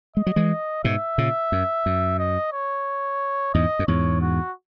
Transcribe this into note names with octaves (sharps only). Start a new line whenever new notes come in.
G#3 D#5
F#3
E3 G#3
G#2 B2 E5
A#2 C#3
F#2
F#2
D#5
C#5
E2 G#2 D#5
F#2
E2 G#2 C#5
F#4